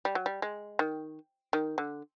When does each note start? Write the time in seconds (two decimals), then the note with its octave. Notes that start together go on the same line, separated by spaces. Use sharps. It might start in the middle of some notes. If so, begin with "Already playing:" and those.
0.05 G3
0.15 F#3
0.26 G3
0.42 G#3
0.79 D#3
1.53 D#3
1.78 D3